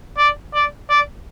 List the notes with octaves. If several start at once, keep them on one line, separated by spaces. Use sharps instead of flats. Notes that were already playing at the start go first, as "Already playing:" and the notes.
D5
D5
D5